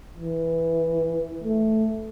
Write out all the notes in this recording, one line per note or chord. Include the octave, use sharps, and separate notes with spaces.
E3
A3